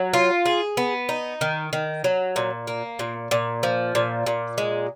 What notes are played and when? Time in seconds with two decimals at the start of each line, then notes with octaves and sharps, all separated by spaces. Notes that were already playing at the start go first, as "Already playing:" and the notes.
Already playing: F#3
0.13 F4
0.46 G#4
0.77 B3
1.09 D#4
1.41 D#3
1.73 D#3
2.04 F#3
2.36 A#2
2.67 A#3
2.99 A#2
3.31 A#2
3.63 F3
3.95 A#2
4.27 A#2
4.58 G#3